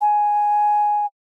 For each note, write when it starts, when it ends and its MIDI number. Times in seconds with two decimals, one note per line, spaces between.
0.01 1.06 80